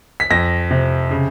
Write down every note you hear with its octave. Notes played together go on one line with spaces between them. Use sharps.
B6
F2 A#6
C3
C#3